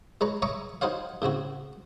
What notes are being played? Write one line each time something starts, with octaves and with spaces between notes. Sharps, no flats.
G#3 B4 C#5 A#5
C#5 E5 A#5 C#6 D#6
D#4 F#4 C5 C#5 F5
A2 C#3 C4 F#4